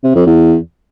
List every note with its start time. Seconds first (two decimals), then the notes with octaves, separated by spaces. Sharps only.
0.03 C3
0.15 F2
0.26 E2